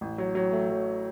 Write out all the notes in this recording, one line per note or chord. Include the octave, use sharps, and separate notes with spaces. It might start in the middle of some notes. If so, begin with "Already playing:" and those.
A1
F#3
F#3
A3
F#3